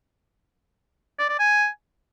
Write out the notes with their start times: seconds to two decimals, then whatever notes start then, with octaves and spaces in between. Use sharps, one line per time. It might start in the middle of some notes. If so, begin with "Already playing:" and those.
1.19 D5
1.29 D5
1.39 G#5